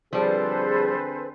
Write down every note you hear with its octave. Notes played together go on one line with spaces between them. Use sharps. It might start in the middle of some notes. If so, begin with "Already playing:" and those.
D3 F3 G3 C4 G#4 A4 B4 C5